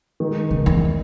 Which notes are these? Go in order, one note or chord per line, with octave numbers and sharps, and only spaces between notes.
D#3 G#3 D#4
C#3
E2